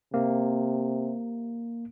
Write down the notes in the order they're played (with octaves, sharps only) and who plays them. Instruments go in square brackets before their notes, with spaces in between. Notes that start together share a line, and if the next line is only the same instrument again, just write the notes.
[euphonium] C3 [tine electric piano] A#3